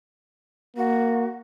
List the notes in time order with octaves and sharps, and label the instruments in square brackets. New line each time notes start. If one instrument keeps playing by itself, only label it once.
[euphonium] A#3 [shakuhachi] F#4